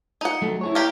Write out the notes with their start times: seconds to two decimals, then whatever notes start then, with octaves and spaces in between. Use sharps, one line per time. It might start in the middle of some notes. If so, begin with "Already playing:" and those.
0.21 D#4 F#5
0.42 F#3 A3
0.61 E4 G#4 C#5
0.75 A#3 G4 A#4